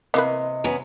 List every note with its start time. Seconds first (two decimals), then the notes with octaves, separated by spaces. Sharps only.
0.14 C3 E3 A#3 B4 D#5
0.64 B3 C#4 A#5